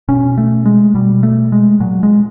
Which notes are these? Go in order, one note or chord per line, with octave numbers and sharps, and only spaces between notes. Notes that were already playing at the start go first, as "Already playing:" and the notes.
B2 C#4
A3
G#3
B2 G3
A3
G#3
A#2 F#3
G#3